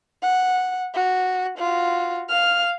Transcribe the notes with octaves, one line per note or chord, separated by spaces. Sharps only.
F#5
F#4
F4 F#4
F5 F6